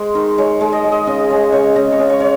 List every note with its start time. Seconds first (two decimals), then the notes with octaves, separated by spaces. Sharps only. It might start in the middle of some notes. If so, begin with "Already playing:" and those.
Already playing: G#3 C5
0.15 D#3
0.38 G#3 C#5
0.61 G#3
0.72 D#5
0.85 G#3
0.92 D#5
1.07 C#3 D#5
1.30 G#3 C#5
1.52 C#3 C#5
1.75 C#3 D#5
1.92 C#5
1.99 C#3
2.10 C#5
2.20 C#5